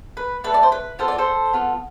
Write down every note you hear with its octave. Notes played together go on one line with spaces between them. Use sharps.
B4
A3 D4 A4 B4
D5
C5
B4
B3 F4 A4 C5
D5
A4 C5
B3 F4 A4